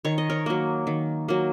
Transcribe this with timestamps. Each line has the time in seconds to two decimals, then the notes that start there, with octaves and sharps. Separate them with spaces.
0.05 D#3 C#5
0.18 D#5
0.30 A#4 C#5
0.46 F#3 A#3
0.87 D#3
1.28 F#3 A#3